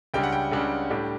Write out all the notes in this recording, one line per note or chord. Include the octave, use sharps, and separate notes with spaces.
C#2 C#3 G3 D4 G5
F#5
G5
C#2 C#3 G3 D4
A2 G3 D4